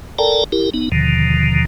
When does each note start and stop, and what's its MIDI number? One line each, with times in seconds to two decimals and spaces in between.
0.19 0.44 69
0.19 0.44 70
0.19 0.44 74
0.19 0.44 79
0.19 0.44 81
0.19 0.44 82
0.52 0.70 64
0.52 0.70 67
0.52 0.70 70
0.74 0.89 59
0.74 0.89 63
0.92 1.65 39
0.92 1.65 47
0.92 1.65 50
0.92 1.65 51
0.92 1.65 53